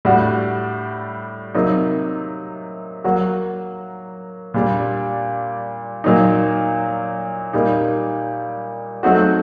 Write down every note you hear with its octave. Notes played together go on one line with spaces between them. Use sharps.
A2 G3 D4 F#4
C3 F#3 A#3 D#4
F#3 A#3 F#4
A#2 G3 D4
A#2 F#3 A#3 D#4
A#2 G3 A#3 D#4
F#3 A3 C4 D#4 F#4